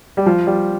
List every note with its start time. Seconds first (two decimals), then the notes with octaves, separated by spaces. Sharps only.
0.17 G3
0.26 F3
0.47 G3